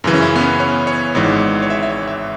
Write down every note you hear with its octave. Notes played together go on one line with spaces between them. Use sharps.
F#2 C#3 E3
C#4
E4
B3
C#4
C#5
C#5
G#1 G#2 E3 C#5
C#5
E5
E5
C#5
E5